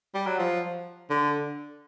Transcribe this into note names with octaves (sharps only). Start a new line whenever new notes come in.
G3
F#3
F3
D3